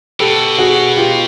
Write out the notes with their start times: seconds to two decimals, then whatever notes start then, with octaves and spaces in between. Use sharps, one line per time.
0.19 B2 G4 A4
0.58 F#4 G#4
0.97 F4 G4